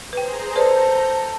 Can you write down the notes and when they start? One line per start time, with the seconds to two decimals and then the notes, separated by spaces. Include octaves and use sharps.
0.13 G#4 B4 C5 G5 A#5
0.56 A4 B4 C5 D5 A#5 G6